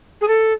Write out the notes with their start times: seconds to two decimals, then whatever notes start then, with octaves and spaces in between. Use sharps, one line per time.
0.21 G#4
0.28 A4